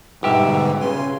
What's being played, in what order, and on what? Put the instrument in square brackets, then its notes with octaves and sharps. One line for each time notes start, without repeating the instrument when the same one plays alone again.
[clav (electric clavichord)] G1 G4 E5 [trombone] G#2 [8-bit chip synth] B2 D3 G3 [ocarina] B4
[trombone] C#3 [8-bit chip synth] G#5 C6